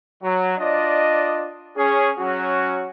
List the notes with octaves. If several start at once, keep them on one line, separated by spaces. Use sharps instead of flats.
F#3
D4 F4 D5 D#5
C#4 G#4
F#3 C#4 F#4